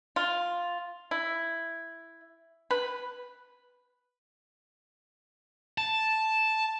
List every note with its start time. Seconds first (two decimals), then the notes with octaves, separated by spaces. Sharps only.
0.16 F4
1.11 E4
2.71 B4
5.78 A5